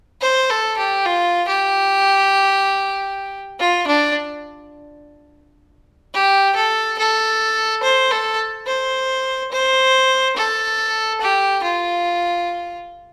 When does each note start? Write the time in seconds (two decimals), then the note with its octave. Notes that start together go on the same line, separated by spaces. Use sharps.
0.21 C5
0.50 A4
0.78 G4
1.05 F4
1.48 G4
3.59 F4
3.87 D4
6.14 G4
6.56 A4
6.98 A4
7.83 C5
8.11 A4
8.66 C5
9.52 C5
10.36 A4
11.21 G4
11.63 F4